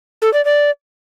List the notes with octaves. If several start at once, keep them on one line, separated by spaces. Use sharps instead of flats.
A4
D5
D5